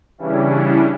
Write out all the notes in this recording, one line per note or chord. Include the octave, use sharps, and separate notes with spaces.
C#3 E3 G3 C#4 D4 E4